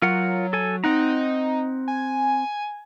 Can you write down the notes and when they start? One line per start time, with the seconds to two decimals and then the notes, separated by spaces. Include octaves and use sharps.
0.02 F#3 F4 A#4 F#5
0.53 A4 G#5
0.84 C4 D#4 F#5 A#5
1.88 G#5